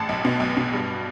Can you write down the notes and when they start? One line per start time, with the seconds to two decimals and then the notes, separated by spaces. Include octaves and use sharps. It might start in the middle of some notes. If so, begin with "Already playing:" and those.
Already playing: A1 A5
0.09 B1
0.25 B2
0.40 B1
0.57 B2
0.73 G2